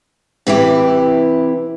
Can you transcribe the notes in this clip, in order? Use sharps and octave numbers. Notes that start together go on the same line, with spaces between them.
C3 E3 E4 G4